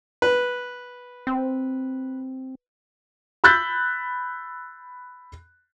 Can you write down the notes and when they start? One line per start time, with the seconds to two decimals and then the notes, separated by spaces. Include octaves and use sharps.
0.22 B4
1.27 C4
3.44 B5 E6 F#6 G6 A6 B6